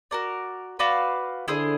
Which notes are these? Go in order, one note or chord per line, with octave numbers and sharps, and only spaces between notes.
F#4 A#4 D5
F#4 B4 D5 F5
D3 E4 G#4 C5